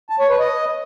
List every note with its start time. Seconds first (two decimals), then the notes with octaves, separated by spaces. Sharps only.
0.10 A5
0.20 C#5
0.30 B4
0.40 D#5